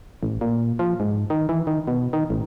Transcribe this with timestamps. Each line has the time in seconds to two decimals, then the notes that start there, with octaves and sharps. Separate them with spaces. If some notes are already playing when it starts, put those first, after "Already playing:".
0.23 A1
0.41 A#2
0.79 F3
1.00 G#2
1.30 D#3
1.49 E3
1.67 D#3
1.88 B2
2.13 D#3
2.30 A1